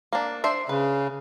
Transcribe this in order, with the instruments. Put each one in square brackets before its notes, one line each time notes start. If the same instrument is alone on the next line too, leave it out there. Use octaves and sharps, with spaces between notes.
[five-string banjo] A#3 D4
D4 C5 E5
[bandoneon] C#3 [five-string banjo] B4